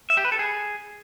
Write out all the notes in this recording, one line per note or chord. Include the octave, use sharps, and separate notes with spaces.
E5
G4
B4
A4
G#4